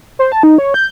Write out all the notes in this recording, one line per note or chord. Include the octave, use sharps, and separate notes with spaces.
C5
A5
D#4
C#5
G6